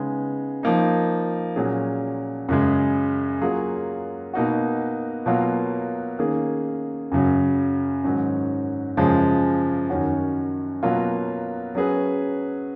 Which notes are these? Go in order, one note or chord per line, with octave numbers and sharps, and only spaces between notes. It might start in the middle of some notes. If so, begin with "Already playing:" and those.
Already playing: C#3 G#3 B3 D#4
F3 A#3 D#4
A#2 F#3 C#4 G#4
F#2 C#3 G#3
F#3 A#3 F4 G#4 C#5
B2 A#3 D#4 F#4
B2 F#3 A#3 F4
D#3 A#3 C#4 G#4
F#2 C#3 F#3
G#2 D#3 F#3 C#4
F#2 C#3 F3 G#3
F#2 D#3 F#3 C#4 F#4
B2 F#3 A#3 F4
F#3 C#4 G#4 B4